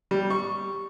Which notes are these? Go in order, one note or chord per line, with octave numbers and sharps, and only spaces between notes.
G3
C#6